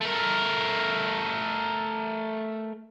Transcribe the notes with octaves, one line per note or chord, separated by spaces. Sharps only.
A3 A#4